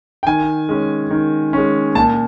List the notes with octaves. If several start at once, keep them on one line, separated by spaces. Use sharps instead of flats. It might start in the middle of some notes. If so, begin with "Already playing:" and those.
G5
D#3 G#5
G#3 C#4
D#3
G#3 C#4
A#2 A5